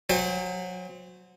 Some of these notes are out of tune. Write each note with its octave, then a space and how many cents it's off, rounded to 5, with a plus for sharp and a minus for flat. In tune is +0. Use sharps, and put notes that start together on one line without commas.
F#3 -25 C5 -15 G5 +40